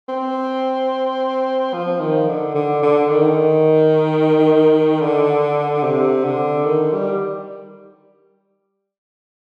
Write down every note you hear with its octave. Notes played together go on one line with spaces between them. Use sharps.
C4
F3
D#3
D3
D3
D3
D#3
D3
C3
D3
D#3
G3